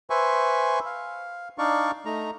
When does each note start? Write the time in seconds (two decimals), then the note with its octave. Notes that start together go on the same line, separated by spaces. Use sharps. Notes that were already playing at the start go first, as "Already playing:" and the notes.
0.10 B4 C5 E5 G#5 C#6
0.86 F5
1.58 D4 D#4 D5 F5 C#6
2.05 A3 D#4 A#5